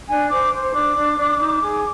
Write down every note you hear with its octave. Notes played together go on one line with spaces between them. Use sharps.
D4 G#5
C5 D6
C5
D4 D6
D4
D4
D#4
G#4